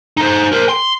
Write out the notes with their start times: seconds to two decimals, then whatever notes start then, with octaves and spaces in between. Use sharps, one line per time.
0.17 D#4 C5
0.52 A#4 C5
0.69 C6